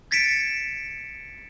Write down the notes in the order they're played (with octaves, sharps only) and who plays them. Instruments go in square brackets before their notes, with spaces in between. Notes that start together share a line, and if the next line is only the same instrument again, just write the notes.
[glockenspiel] G#6 A6 B6 C#7 D7 E7